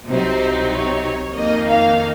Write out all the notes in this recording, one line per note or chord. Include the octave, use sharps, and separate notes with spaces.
C2 C3 F#3 C4 D#4 C5
C#5
F2 D#3 A#3 D#4 D#5
F5